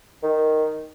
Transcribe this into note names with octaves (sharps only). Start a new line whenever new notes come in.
D#3